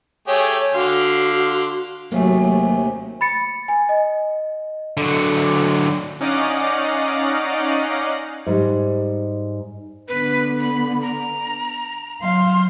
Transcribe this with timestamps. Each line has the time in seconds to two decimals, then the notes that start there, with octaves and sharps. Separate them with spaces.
0.27 A3 G4 G#4 C#5
0.74 D3 F#4 F5 C6
2.12 D#2 C3 F#3 A3 A#3 C#4 G#4
3.21 B5 A6 C#7
3.68 G#5
3.89 D#5
4.97 D3 F#3
5.10 C#7
6.21 C#4 D#4 D5 D#5 F5 F#5
8.47 G#2 G3
10.08 D3 B3 B4
10.59 B5
11.02 A#5
12.21 F#3 F5 C6